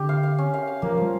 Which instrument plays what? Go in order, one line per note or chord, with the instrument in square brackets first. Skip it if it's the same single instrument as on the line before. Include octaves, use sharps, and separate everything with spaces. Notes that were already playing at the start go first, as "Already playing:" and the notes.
Already playing: [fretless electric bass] D3 [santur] G4
[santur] F5
F5
C#4
F5
F5
[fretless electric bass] F3 [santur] A#3
[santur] F3 [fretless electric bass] G3